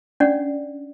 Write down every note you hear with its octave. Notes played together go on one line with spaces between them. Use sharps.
C#4 D4 D5 F#5